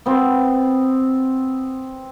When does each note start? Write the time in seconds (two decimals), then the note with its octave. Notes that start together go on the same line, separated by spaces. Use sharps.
0.06 B3 C4